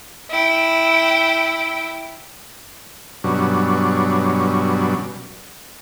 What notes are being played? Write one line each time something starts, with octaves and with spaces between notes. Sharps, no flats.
E4 G5
G2 B2 F#3 C#4 D4